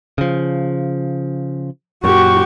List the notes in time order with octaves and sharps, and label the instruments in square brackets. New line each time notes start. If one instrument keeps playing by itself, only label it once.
[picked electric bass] C#3 F3
[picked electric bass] F#2 A#2 [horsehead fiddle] F#4 G4 [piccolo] C#6